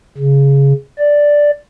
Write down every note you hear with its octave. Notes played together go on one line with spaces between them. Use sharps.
C#3
D5